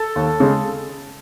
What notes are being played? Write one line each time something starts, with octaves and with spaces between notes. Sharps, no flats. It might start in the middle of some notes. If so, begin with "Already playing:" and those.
Already playing: A4
D#2
C#3 G#3